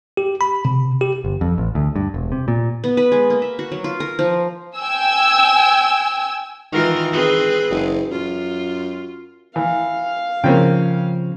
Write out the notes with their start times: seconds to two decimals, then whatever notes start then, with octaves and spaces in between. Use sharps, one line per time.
0.17 G4
0.41 B5
0.65 C3
1.01 G4
1.24 G1
1.41 F2
1.58 A1
1.75 D2
1.96 G2
2.14 E1
2.32 C3
2.48 A#2
2.84 B3
2.97 B4
3.12 G#3
3.30 A#3
3.42 E5
3.59 F#4
3.72 F#3
3.84 F4
4.00 A#4
4.19 F3
4.77 G5 G#5 E6
6.72 D#3 E3 F4 A#4
7.12 C4 G#4 B4
7.70 F#1
8.11 F#2 F4
9.56 E3 F5
10.44 C#3 F3 A#3 C4 C#4 G5